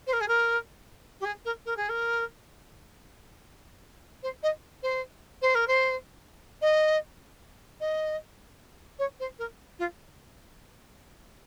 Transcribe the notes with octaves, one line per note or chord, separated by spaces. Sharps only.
C5
A#4
G#4
A#4
G4
G#4
A#4
A#4
G#4
A#4
C5
D#5
C5
C5
A#4
C5
D#5
D#5
C#5
C5
A#4
F4